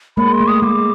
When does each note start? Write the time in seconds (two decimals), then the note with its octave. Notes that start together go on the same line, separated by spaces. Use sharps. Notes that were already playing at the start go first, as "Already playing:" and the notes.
0.17 G#3 A#3 B5
0.33 C6
0.41 A3
0.48 D#6
0.62 G#3 D6